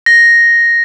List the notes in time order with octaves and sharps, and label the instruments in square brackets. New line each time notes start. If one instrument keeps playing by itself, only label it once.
[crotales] A#6